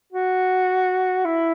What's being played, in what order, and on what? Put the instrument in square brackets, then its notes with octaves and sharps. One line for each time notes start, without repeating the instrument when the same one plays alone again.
[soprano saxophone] F#4
E4